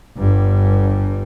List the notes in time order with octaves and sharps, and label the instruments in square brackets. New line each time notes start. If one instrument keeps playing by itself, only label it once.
[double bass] G1 G2